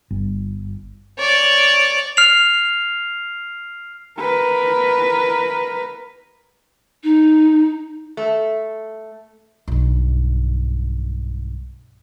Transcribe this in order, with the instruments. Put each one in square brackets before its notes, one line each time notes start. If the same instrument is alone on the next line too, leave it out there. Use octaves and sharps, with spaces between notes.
[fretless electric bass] G1
[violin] C#5 D5
[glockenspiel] F6 C7 F7
[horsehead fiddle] A#4 B4
[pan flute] D#4
[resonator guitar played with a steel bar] A3
[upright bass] B1 G2